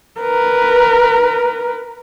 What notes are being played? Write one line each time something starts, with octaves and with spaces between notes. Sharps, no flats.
A#4 B4